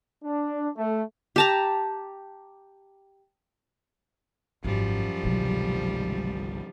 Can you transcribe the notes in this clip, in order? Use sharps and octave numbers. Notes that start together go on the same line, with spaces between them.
D4
A3
G4 A5 A#5
G#1 F#2 F3 G3
G1 C2 B2 D#3 F#3 G#3